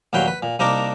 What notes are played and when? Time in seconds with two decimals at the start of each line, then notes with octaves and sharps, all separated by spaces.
0.13 D#2 A#2 F#3 B4 G5 C6
0.28 B4
0.43 A#2
0.59 C2 A#3 D4 D#4 A#4 D6